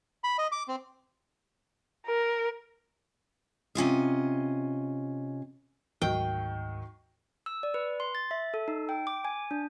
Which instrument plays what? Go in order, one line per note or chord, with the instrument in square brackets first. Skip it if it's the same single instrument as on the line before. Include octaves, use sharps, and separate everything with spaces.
[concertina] B5
D#5
D6
C4
[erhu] A#4
[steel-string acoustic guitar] C3 C#4 F4 D#5
[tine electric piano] D2 G#2 [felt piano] D#3 F#3 [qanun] G5
[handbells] E6
D5
B4
C6
A6
E5
A4
D#4
G5
D6
G#5
D4